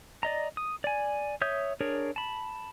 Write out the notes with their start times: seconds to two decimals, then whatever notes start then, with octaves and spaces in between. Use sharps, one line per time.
0.23 D5 D#5 A#5
0.57 D#6
0.84 D5 G#5
1.42 C#5 E5 D#6 G6
1.81 D4 G#4 A#4 C#5
2.16 A5 B5